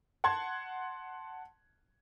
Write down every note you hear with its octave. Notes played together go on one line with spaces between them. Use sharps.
F#5 A5 C6 G#6